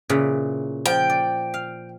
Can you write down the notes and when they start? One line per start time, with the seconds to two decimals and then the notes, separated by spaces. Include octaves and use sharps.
0.09 A#2 C#3 E3
0.86 F3 G5
1.10 D5
1.54 F5